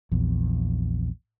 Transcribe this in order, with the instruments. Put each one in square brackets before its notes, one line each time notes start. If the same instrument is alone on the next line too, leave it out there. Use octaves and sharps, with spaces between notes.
[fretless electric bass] A#1 E2